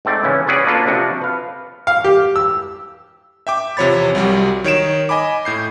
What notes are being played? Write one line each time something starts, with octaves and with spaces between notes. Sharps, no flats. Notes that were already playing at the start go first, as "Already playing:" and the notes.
G#2 A3 C4 D5
C#3 E3 C#4 E4
C#4 F#4 G#4 B4 D5
A#3 D4 F4 A4 B4
C3 F3 D4 F#4
B4 F5
F5
G4
E6
E5 G5 D6
E2 C3 F3 C#5 B5 A6
C2 F#3 G3
D#3 C#5 D7 E7
D#5 G#5 B5 D6
A2 G6 C7